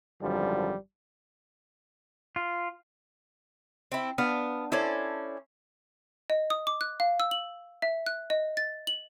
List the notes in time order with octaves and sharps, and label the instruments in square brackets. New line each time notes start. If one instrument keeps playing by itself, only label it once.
[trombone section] G#1 F#2 D3 F3 G3
[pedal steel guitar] F4
[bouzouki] C4 E4
[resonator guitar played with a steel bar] B3 D4 [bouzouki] F5
[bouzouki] C#4 D5 [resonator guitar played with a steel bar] E4 A4 C5
[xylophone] D#5
D#6
D6
F#6
F5
E6
F#7
E5
F#6
D#5
A6
F#7